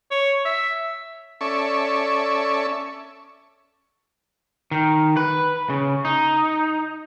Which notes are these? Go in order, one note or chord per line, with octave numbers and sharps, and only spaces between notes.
C#5
E5
C#4 A4 D5 E5 C#6
D#3
B4
C#3
D#4